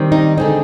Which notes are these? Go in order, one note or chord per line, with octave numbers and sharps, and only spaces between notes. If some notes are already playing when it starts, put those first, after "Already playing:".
Already playing: D#3 G3 C4
D#4
D3 G#3 C4 D#4